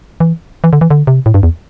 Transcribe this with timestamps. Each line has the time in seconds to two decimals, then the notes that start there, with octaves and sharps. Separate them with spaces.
0.20 E3
0.64 E3
0.73 D3
0.81 E3
0.90 D3
1.07 C3
1.26 A2
1.34 G2
1.43 E2